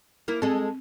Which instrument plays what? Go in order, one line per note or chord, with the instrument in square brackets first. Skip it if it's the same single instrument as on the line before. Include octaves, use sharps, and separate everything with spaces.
[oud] A#3 E4
[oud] G#3 A4 [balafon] C4